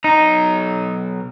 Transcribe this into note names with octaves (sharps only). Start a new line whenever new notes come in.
B1 D#4 A#5